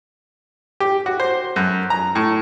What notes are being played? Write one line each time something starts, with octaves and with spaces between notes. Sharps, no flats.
G4
F#4
C5
F#2
A#5
A2